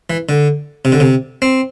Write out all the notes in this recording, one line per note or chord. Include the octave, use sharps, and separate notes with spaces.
E3
D3
C3
D3
C3
C4